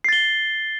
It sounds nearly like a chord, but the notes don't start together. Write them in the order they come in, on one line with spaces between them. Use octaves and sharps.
C7 A6 G7